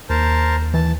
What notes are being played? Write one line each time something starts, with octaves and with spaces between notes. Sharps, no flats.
D#2 A#4 C5 A5
E3 A5